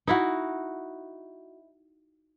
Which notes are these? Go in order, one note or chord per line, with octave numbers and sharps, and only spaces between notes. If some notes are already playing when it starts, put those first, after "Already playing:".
D#4 E4 F#4